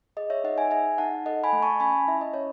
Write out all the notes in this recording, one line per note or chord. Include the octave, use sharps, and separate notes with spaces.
G#4 D#5
C#5 E5
D#4 D#5 F#5
E5 G#5
G#4 E5 G#5
D#4 F#5 A5
A4 D#5 F#5
G#5 B5
A3
A5 C#6
C#4 G#5 B5
E4 E5
D#5
C#4 C#5